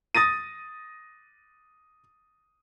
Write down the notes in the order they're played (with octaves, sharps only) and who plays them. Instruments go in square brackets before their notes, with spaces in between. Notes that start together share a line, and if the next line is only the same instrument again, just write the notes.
[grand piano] D#6 A6 A#6 D#7